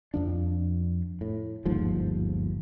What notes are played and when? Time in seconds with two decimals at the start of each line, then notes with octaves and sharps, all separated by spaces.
0.14 F2 F3 D4
1.21 A2
1.65 G1 D#2 G#2 F3